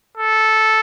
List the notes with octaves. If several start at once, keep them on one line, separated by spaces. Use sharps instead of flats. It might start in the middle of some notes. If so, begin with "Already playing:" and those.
A4